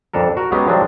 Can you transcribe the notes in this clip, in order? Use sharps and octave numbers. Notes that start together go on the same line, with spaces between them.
F2 D4 A4 A#4
F#4 A#4
F#3 G#3 B3 C#4 G4
D#3 F3 F#3 G#3 C4 D4